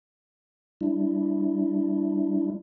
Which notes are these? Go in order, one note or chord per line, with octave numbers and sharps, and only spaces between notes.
G3 D4 E4